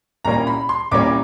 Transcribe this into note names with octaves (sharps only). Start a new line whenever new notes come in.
C2 A#2 G3 A#3 C#4 A#5
B5
C6
C2 A#2 G3 A#3 C#4 D6